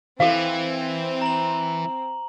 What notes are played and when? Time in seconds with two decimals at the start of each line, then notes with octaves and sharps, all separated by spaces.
0.20 E3 C4 A4 F5
1.21 A#5 F#7